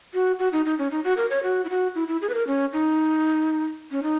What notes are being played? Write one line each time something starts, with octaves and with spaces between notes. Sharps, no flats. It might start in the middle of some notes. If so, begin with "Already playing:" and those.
F#4
F#4
D#4
D#4
C#4
D#4
F#4
A#4
C#5
F#4
E4
F#4
E4
E4
G#4
B4
A#4
C#4
D#4
C#4
D#4